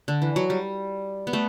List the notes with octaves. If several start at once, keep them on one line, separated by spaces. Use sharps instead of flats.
D3
E3
F#3
G3
B3
A3